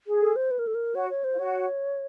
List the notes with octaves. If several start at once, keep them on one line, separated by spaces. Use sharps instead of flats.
G#4
A4
C5
B4
A#4
A4
A#4
F#4 C#5
C#5
C5
F4
F#4 C#5